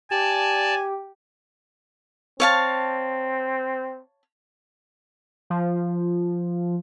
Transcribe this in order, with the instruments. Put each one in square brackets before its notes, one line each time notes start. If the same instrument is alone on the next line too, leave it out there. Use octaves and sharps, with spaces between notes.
[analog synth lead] G4 [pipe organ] D5 A5 [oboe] G#5
[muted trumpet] C4 [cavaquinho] C#5 F5 A5
[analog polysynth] F3